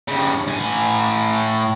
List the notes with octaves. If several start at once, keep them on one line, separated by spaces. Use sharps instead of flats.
G2 C#3
A2 G#5